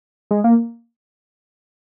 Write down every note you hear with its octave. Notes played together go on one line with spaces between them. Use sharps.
G#3
A#3